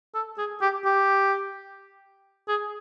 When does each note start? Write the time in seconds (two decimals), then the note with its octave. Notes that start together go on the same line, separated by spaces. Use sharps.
0.14 A4
0.38 G#4
0.62 G4
0.85 G4
2.48 G#4